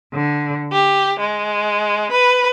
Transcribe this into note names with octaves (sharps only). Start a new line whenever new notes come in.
D3
G4
G#3
B4